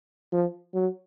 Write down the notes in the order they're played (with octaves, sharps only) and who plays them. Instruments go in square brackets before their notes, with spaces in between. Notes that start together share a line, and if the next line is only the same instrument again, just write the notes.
[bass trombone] F3
F#3